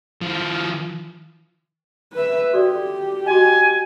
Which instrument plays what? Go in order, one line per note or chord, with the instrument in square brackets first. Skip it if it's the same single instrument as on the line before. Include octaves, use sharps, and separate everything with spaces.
[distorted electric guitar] F3 E4
[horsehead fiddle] B4 E5
[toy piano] F#4 A4 D5 [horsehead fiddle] G4
[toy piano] F#4 D#5 [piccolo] G#5